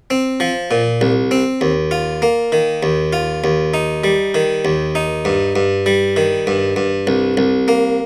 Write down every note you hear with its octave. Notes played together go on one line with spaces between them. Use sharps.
C4
F3
A#2
C2
C4
D#2
F4
A#3
D#3
D#2
F4
D#2
D#4
G3
D#3
D#2
D#4
G2
G2
G3
D#3
G2
G2
C2
C2
A#3